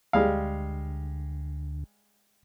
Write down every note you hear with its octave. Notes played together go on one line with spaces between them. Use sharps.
D2 G3 G#3 F5